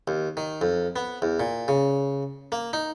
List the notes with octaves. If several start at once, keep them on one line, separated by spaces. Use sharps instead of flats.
D#2
D#3
F2
B3
E2
A#2
C#3
A#3
D#4